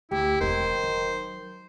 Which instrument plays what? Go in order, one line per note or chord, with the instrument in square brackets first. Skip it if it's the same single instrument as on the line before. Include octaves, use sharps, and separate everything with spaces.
[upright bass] D2 [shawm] E4 [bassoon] G4
[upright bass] E1 C4 [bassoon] D#3 [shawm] C5
[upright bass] F#3